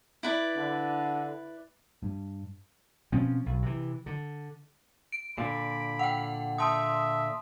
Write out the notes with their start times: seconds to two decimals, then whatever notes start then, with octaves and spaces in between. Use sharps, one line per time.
0.23 E4 B4 D5
0.55 D3
2.03 G2
3.12 B2 F3 C4 C#4
3.46 B1
3.62 C3 E3
4.06 D3
5.12 D7
5.38 A#2 D3 B5
5.99 F#5 G5
6.58 E5 A5 C6 D#6